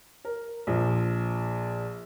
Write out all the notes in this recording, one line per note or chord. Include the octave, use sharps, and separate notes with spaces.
A#4
A#1 F3